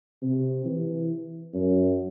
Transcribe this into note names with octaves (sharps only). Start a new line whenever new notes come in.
C3
E3
F#2